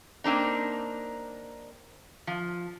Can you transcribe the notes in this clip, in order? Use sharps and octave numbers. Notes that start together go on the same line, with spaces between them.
A#3 C4 D4 D#4
F3